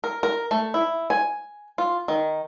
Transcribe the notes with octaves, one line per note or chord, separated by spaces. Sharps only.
A#4
A#4
A3
E4
G#5
F4
D#3